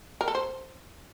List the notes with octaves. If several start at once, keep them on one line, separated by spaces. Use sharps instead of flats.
A#4
A4
C5